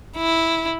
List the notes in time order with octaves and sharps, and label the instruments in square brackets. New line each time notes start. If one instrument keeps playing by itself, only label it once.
[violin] E4